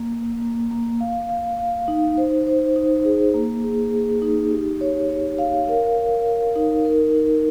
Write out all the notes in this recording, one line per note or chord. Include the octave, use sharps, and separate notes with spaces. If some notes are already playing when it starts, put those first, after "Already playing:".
Already playing: A#3
A#3
A#3
A#3
F5
F5
F5
D#4
C5
C5
D#4
G#4
A#3
G#4
G#4
D#4
G4
C#5
C#5
F5
A#4
A#4
A#4
D#4
A#4
D#4